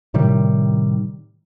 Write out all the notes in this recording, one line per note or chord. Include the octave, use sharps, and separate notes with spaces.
A2 C3 D#3 G3